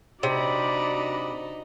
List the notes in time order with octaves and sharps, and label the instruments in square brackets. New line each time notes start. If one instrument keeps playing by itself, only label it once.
[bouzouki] C3 [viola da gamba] D4 D#4 F#4 [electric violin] D5 B5